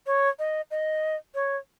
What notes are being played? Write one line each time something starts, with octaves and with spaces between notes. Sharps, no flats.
C#5
D#5
D#5
C#5